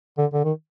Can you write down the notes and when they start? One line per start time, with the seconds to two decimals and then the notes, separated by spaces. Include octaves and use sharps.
0.18 D3
0.33 D3
0.44 D#3